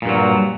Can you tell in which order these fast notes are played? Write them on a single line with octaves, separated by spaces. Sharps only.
A#2 G2 F#3